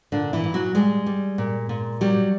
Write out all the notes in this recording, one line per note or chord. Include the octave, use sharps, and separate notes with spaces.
A#2 D3 D4
E3 E4
A#2
F#3 F#4
G3 G#3 G#4
G3
A#2
A#2
F#3 G3 G4